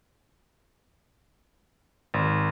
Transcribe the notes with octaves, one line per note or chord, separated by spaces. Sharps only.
G#1